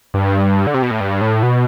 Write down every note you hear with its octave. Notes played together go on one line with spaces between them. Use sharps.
G2
D3
C3
B2
A2
G2
A2
B2